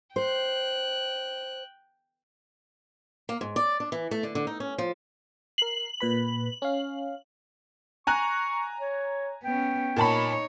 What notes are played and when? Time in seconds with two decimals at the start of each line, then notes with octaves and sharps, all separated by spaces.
0.16 C5 G5 F#6
3.29 A#3
3.41 G#2
3.56 D5
3.80 D4
3.92 E3
4.11 A3
4.23 D3
4.35 D3
4.47 D#4
4.60 C#4
4.78 F3
5.58 A#4 C7 F#7
6.00 A#2 B4 B5
6.62 C#4 F5
8.07 G#5 A#5 C#6 F#6
8.80 C#5
9.44 B3 C#4 G5
9.96 A#2 D#4 C#5 A5 B5